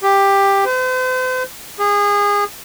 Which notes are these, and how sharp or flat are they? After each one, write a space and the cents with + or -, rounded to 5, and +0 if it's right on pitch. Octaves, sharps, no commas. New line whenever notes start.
G4 +10
C5 -45
G#4 -25